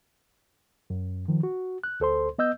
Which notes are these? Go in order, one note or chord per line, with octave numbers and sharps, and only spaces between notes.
F#2
D#3 F3
F#4
F#6
D2 A4 C5 C6
B3 D#5 E6 G6